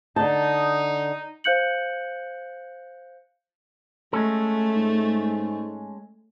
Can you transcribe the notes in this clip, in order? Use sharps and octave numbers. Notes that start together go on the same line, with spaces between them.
D3 D#4 A5
C5 F5 F#6 G6 C#7 F#7
G#3 A3 C#4 A4
G#2